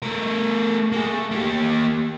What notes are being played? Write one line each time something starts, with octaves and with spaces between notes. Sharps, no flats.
A3 A#4
A#3 G#4
A3
A#3 G4